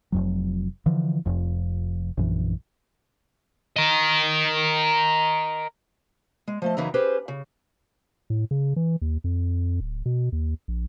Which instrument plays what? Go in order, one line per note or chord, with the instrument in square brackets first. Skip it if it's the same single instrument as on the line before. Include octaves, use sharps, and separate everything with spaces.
[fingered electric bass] F1 F2 F#3
D3 E3 F3
F1 F2
A#1 F#2 E3
[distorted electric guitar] A#4 D#5
[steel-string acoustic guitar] G#3
F3 A3 D#5
F#2 C#3 E3 D#4 E5 A#5
C#4 G4 G#4 B4 C5
C#3
[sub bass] A2
C#3
E3
D#2
F2
D1
B2
D#2
A#1